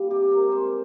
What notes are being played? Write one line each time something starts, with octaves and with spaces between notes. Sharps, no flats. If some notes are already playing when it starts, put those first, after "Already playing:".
Already playing: G3 A#3
C3 G4
A#4
G#3
C5